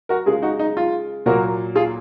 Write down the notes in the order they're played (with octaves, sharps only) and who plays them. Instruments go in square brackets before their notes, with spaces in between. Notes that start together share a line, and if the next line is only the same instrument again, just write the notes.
[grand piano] F#4 A#4
C#3 G#3 F4 G#4
D#4 F#4
D#4
F4
A#2 F#3 A#3 F#4 A#4
F4 G#4